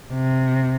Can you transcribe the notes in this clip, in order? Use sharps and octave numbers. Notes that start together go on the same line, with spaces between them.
C3